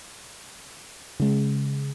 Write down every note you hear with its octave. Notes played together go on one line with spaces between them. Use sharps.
C#3 G#3